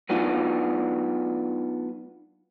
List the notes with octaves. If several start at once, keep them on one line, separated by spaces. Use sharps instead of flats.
F#3 A3 B3 D4 D#4 F4